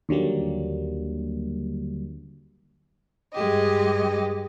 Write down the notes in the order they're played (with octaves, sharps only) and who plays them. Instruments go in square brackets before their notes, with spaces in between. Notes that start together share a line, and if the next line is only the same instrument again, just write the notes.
[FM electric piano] D#2 D3 F#3 G3 A#3
[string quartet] G2 G#3 G4 D#5